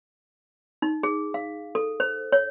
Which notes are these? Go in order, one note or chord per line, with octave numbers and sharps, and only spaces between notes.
D#4
G#4
F5
A4
C5
C#5